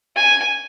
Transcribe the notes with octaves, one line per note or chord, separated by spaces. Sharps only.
G#5